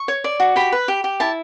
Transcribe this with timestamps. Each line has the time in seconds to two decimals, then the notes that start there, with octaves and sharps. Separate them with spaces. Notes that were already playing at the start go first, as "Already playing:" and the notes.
Already playing: C#6
0.08 C#5
0.24 D5
0.40 F#4
0.56 G4 B5
0.72 B4
0.88 G4
1.04 G4
1.20 E4 A5